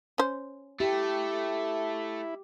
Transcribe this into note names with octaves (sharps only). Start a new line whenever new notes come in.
C#4 C5
A3 E4 G4